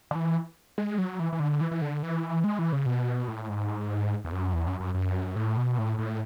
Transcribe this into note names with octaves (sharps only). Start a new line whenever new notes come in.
D3
E3
G#3
F#3
E3
E3
D3
E3
E3
D3
E3
G#3
E3
C#3
B2
A2
G#2
E2
F#2
E2
F#2
F#2
F#2
A2
B2
A2
A2